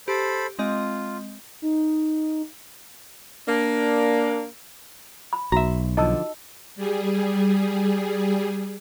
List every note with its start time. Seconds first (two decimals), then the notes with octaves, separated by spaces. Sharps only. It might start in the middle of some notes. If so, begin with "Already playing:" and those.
0.08 G4 A4 C5 B5
0.59 G#3 C4 F4 D#5
1.62 D#4
3.47 A#3 D4
5.33 B5
5.52 B1 F#4 E5 A#5
5.97 D3 F3 D#4 D#5 A5 E6
6.76 G3 G#4